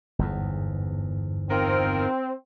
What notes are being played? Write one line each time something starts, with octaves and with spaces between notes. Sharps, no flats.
G1 E2 G#2
D#3 C4 F4 A#4